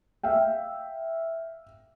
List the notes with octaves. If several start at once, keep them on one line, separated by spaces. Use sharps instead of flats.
E5 F5 G5